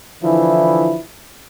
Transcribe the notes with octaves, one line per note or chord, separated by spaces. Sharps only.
D3 E3 F3 E4